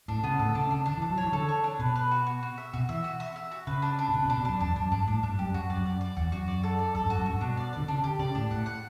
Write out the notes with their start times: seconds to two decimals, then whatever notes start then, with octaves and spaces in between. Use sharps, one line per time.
0.08 A2 D4
0.23 C#3 B3
0.39 A2 A4
0.48 D3
0.55 C#3 D4
0.71 C#3 D4
0.86 D3 D4
0.97 E3
1.02 D4
1.10 F#3
1.18 E3 C#5
1.33 D3 A4
1.49 C#5
1.64 D4
1.79 B2 B4
1.96 B4
2.11 F#4
2.27 F#4
2.43 F#4
2.58 E5
2.73 B2 F#4
2.89 E3 E5
3.04 F#4
3.20 E5
3.36 E5
3.51 F#4
3.67 C#3 B4
3.82 D4
3.99 D4
4.09 B2
4.13 C#3 B4
4.25 B2
4.30 D4
4.38 B2
4.45 F#2 D4
4.61 E2 D4
4.76 F#2 D4
4.92 G2 D4
5.07 A2 D4
5.23 G2 D4
5.39 F#2 G4
5.54 F#2 F#4
5.70 D5
5.78 F#2
5.85 D5
6.01 D5
6.17 E2 F#4
6.32 F#2 F#4
6.48 D5
6.63 A4
6.79 D5
6.95 F#2 A4
7.06 G2
7.10 F#4
7.18 F#2
7.26 G2 F#4
7.41 B2 D4
7.57 D5
7.73 D3 D5
7.88 C#3 D4
8.04 D3 G4
8.19 C#3 D5
8.35 A2 D4
8.51 A2 F#5
8.66 F#5